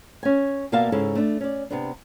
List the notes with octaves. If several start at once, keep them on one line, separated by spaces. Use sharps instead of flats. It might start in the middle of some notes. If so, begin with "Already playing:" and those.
C#4 G#5
B2 A#3 D5 E5 F5 A5
G#2 C#3 E4 A4
A3 D4
C#4 D5
C3 B3 D4